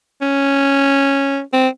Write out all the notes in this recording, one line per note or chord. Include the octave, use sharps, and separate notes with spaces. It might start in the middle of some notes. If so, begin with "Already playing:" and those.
C#4
C4